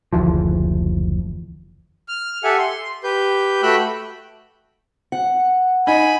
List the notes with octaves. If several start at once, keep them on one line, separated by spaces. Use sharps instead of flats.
F#1 D2 E3 F3
F6
G4 A4 E5 F#5 G#5
C6
G4 B4 G6
A3 F#4 G5 B5 E6 F#6
F#5
D#4 G#5 B5